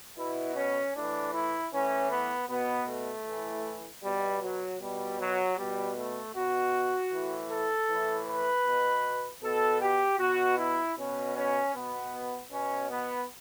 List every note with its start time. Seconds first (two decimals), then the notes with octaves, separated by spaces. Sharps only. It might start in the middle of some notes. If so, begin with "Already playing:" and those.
0.17 B2 E4
0.55 C#4
0.95 A2 E3 D4
1.34 E4
1.72 A2 E3 C#4
2.11 B3
2.49 B2 B3
2.87 A3
3.25 A2 E3
4.02 B2 G3
4.42 F#3
4.80 B2 G3
5.18 F#3
5.57 B2 G3
5.96 A3
6.34 B2 F#4
7.12 A2 E3
7.50 A4
7.89 A2 E3
8.27 B4
8.66 B2
9.42 B2 A4
9.82 G4
10.19 B2 F#4
10.58 E4
10.97 B2 C#4
11.36 C#4
11.74 B2 B3
12.51 B2 C#4
12.90 B3